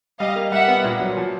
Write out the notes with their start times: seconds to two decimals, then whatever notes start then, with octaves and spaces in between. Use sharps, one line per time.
0.20 G3 D#5 F5
0.36 A#3
0.52 G3 E5 F#5
0.68 B3
0.84 A#2
1.00 F#3
1.17 F3